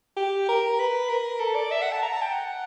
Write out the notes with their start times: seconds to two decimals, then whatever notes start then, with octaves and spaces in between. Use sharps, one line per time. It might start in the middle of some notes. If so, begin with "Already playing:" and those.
0.17 G4
0.48 A#4
0.79 B4
1.09 A#4
1.40 A4
1.55 D5
1.71 E5
1.82 F#5
1.92 A5
2.02 A#5
2.13 A5
2.22 G5
2.32 F#5